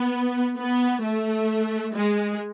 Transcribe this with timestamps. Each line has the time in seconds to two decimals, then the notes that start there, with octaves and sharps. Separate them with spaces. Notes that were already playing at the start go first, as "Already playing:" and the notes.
Already playing: B3
0.57 B3
1.03 A3
1.95 G#3